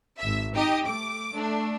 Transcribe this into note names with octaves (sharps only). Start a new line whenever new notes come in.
G#1 E5
D#4 G4 D#5
A3 D6
A3 D4